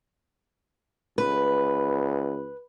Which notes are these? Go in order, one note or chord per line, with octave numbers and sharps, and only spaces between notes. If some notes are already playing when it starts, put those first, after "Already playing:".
C#2 B4